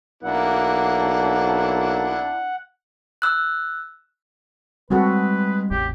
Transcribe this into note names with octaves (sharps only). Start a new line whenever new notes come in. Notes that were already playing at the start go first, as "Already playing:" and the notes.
B1 A#3 D4 E4 F#5
E6 F#6
G3 G#3 C4 F#4 A4 B4
A1 E2 A2 G4